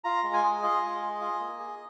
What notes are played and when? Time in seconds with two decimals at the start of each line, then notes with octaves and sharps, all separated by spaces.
0.04 F4 A#5
0.23 G#3
0.33 G#5
0.43 G#4
0.63 F4 D#5
0.82 G#3
1.02 G#4
1.21 F4
1.40 A#3
1.59 G#4